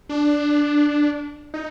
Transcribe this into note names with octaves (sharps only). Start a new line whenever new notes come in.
D4
D#4